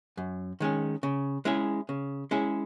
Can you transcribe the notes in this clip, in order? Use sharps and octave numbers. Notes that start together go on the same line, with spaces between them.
F#2
D#3 G#3 C#4
C#3
G#3 C#4 E4 G#4
C#3
G#3 C#4 E4 G#4